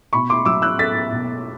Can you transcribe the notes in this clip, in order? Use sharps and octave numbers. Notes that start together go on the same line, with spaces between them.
B2 B5 C#6
C6 D6
F#3 D6 E6
E6 F#6
A3 A6 B6
B2